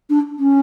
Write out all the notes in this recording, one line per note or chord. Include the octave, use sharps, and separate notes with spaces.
D4
C#4